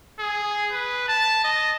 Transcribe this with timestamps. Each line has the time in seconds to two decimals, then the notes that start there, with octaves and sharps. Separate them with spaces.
0.20 G#4
0.72 B4
1.08 A5
1.44 D#5